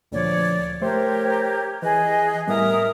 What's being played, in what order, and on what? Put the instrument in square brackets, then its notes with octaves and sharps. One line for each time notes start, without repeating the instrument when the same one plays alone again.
[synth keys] D2 A#2 F3 [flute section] C#5 D5
[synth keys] A3 C5 [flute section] G4 A#4 C#5
[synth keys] E3 [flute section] G#4 D#5 F#6
[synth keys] A2 G3 B3 [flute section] A#4 E5 D#6